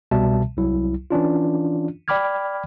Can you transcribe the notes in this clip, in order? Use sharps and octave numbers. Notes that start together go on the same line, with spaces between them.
C2 B2 G3 E5 A5
C2 F#3 E4
E3 C#4 D4 F4
D5 G5 B5 D6 F6 G#6